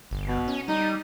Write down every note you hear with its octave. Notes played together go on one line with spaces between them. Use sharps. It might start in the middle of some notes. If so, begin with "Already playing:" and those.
G1
B2
C#4
G3 D#4